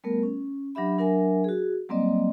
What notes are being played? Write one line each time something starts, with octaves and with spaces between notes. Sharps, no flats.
G3 A3 B3 A#4
C#4
F#3 D4 G4 E5 B5
F#3 D4 A#4 E5 G#5
F#4 G#4
F#3 G3 A#3 C4 D5 D#5